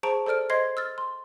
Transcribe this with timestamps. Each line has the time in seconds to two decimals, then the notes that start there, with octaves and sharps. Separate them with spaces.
0.03 G#4 C5 A5 A#5 C#6 D7
0.26 A4 C5 D5 F6 D7
0.50 C5 D#5 C6 G#6 C7
0.77 E6 F6 A6
0.98 C6